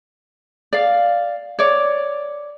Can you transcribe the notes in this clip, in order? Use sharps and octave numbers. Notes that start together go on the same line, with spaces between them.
D5 F5
C#5 D5